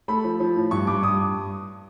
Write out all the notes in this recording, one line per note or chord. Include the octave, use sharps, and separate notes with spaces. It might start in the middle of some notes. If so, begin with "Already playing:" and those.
A3 B5
F3
F3
A2
G2 C#6
G2 D6
G2 D#6